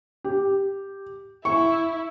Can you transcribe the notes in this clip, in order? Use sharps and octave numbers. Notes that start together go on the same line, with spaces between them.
G4
E4 C#6